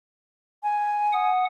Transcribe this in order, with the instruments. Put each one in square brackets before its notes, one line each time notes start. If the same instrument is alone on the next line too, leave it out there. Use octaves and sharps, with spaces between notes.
[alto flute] G#5
[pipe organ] F#5 D#6